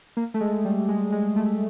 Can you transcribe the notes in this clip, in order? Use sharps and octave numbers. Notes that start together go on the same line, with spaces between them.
A#3
A3
G#3
G3
G#3
G#3
A3